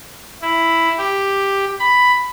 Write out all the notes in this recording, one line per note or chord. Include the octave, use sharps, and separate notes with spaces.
E4
G4
B5